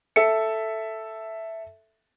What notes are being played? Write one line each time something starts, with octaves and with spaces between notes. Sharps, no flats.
A4 E5 C#7